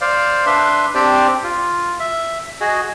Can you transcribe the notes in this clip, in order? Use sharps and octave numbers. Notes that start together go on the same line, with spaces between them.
C5 D5 F5
D4 B4 E5 C6
C4 D4 G4 C5 D5
F4
E5
F#4 G#4 D#5